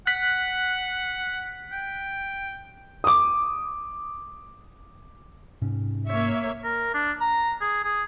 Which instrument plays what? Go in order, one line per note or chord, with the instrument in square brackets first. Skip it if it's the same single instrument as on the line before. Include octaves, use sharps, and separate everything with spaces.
[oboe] F#5 [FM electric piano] F#6 B6
[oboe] G5
[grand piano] D6 D#6
[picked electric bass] G#2 C3 C#4
[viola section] A#3 C#5 E5
[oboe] A#4
D4
A#5
G#4
G#4